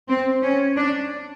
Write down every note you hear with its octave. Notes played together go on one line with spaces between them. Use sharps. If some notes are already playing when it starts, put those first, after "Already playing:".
C4
C#4
D4